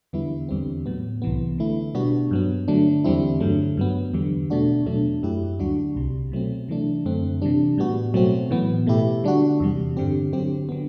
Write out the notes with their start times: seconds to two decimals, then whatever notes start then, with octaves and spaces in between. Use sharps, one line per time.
0.13 E2 D3 G3 B3 E4
0.49 E2 D3 G3 C4
0.86 A2 F#3 B3
1.22 C2 C3 E3 B3
1.58 D3 A3 E4
1.95 B2 G3 B3 D4 F#4
2.31 G2 F#3 B3
2.68 D3 F#3 A3 D4
3.04 E2 D3 G3 C4 E4
3.40 G2 D3 F#3 A3
3.78 G2 F#3 B3
4.14 E2 D3 G3
4.50 B2 A3 D4 F#4
4.86 E2 B2 F#3 A3 D4
5.23 F#2 F#3 A3 E4 G4
5.59 D2 D3 G3 D4 F#4
5.96 C2 C3 G3
6.32 B2 F#3 A3 C4
6.68 C3 E3 A3 D4
7.06 F#2 D3 A3 C4
7.42 C3 E3 G3 D4
7.78 A2 G3 B3 F#4
8.14 B2 F#3 A3 C4 F#4
8.51 A2 E3 B3
8.87 B2 A3 E4 G4
9.24 D3 G3 D4 F#4
9.60 E2 C3 G3
9.97 G2 D3 G3 C4 G4
10.33 D3 F#3 C4 G4
10.69 D3 F#3 B3